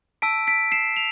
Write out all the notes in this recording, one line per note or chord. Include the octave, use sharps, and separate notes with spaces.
A5 E6 B6 D7
B6 D7
C7 E7
F7